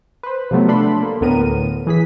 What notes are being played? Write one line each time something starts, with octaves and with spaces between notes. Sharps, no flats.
B4 C5
C3 F3 F#3 A3 B3
A3 D4 A4 B5 C6
A#3
D2 A2 B3 A#4 D#7
E3 G#4 B6